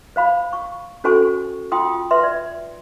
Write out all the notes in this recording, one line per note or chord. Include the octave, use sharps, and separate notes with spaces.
C5 F5 B5
C#6
C#4 F#4 A4 C5 G#5 C#6
F4 G5 C6 D#6
B4 E5 C6
D5